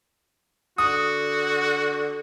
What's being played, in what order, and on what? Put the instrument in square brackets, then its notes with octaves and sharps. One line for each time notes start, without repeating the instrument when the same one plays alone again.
[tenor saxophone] D3 [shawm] F#4 [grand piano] D#6